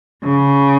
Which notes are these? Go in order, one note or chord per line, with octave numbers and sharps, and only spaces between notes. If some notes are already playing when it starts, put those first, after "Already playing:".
C#3